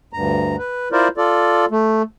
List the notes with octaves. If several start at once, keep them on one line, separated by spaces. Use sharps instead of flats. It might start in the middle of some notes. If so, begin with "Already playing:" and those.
D2 G2 A#5
B4
E4 F4 A#4 C5 D5
F4 A4 D5
A3